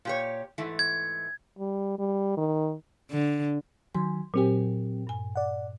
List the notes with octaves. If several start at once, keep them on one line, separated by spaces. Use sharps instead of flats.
A#2 G4 C#5
G#2 E3 A3
G#6
G3
G3
D#3
D3
D#3 F#3 G#5 C6
A#2 F#3 C4 G4 G#5
G2 G#5
D5 F#5